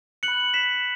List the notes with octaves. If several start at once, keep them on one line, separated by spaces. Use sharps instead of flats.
F#6 C#7 F#7
B5
B6 E7